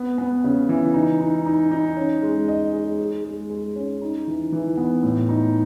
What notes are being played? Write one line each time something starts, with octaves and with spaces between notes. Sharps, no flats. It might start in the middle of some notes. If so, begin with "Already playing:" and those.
Already playing: B3
B3
C#3
E3
D#4
D#4
D#4
D#4
C#4
G#3
D#5
G#3
G#4
G#3
G#3
C#4
D#4
E3
E3
B3
A2
D#4